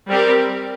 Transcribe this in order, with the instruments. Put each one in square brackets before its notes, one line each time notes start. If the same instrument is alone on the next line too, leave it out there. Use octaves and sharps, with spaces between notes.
[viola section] G3 C4 G4 A#4